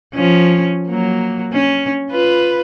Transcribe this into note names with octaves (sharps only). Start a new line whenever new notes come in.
F3 C#4
F#3 A#3
C#4
F4 B4